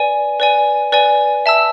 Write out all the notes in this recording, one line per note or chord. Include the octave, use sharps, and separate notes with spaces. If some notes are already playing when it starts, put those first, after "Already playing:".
Already playing: B4 D5 G#5
B4 D5 G#5
B4 D5 G#5
E5 A5 E6